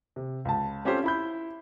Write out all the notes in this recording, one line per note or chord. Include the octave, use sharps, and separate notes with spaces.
C3
C#2 A5
C4 C#4 F4 G4 A4 C5
E4 B5 G6